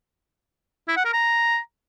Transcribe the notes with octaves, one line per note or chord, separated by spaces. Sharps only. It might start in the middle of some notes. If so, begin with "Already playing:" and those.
E4
F#5
A#4
A#5